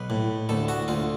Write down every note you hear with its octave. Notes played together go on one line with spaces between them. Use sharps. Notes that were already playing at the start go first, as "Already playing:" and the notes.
Already playing: B1 B4
A2
D2 A4
F#4
D2 F4